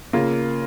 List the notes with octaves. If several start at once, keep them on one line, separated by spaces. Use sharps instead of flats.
C#3 A#3 F4